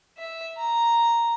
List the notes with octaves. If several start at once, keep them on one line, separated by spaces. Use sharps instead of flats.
E5
A#5